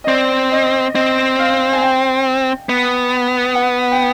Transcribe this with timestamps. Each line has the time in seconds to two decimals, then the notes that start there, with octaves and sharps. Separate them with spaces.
0.04 D#5
0.08 C4 D5
0.51 D#5
0.95 C4 D#5
1.39 F5
1.73 G#5
1.81 G5
2.69 B3
3.55 F#5
3.91 G5